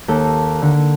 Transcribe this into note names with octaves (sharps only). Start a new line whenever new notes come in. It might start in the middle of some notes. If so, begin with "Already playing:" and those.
D#2 A4
D3